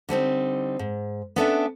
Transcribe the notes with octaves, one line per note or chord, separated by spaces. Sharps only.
D3 G3 C4 D#4
G#2
B3 C#4 D4 A4 B4 E5